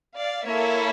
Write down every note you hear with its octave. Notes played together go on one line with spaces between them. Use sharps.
D5 F5
A#3 E4 A4 C#5 E5